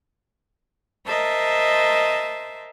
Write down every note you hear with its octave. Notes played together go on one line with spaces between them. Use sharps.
A#4 C5 D#5 E5 A5